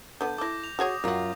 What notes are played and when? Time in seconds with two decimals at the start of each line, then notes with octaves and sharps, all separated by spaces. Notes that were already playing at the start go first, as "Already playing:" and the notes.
0.21 D3 B3 G6
0.38 E4 A4 D6 A#6
0.64 F7
0.79 F#4 G#4 C#5 D#6
1.04 F#2 F#3 F4 F#4